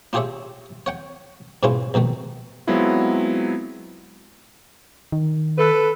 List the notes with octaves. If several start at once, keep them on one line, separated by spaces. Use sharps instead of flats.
D4 F4 G4 G#4 C#5 E5
C#5 F#5 G5
G#2 B2 G#3 C#4 E4 F4
A#1 B2 D#3 A3
F#3 G#3 B3 C4 E4 F4
D#3
A4 B4